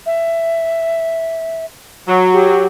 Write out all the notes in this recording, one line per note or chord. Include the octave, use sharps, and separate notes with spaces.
E5
F#3
G4